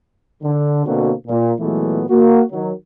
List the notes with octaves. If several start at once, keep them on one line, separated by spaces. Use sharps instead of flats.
D3
B2 D3 A#3 C4 F#4
A#2
A#2 E3 F#3 G#3 A3 B3
A#3 F#4
D#3 F#3